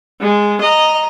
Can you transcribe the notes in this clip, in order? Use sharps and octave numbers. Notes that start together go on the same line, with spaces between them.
G#3
D#5 A#5